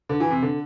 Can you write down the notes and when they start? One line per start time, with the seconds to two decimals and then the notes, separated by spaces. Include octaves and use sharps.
0.09 D3
0.20 E3
0.31 C3
0.42 D3